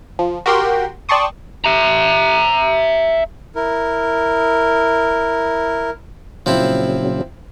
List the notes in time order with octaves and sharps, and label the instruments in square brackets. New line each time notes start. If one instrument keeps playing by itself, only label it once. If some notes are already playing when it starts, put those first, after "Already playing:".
[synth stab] F3
F#4 G4 A#4 G5 C6
D5 G5 A5 C6 C#6 D#6
[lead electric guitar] E5 A#5
[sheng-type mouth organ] E4 A#4
[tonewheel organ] A#2 C#3 F#3 [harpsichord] F3 C4 E4